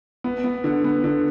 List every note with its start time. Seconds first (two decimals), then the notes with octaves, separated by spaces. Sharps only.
0.24 B3
0.44 B3
0.64 D3
0.84 B3
1.04 D3